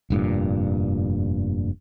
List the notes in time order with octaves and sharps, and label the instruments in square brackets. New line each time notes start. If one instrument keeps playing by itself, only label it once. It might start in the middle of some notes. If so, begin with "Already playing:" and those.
[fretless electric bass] F1 G2 A#2